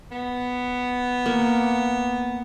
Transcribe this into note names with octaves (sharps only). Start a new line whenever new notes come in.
B3
A#3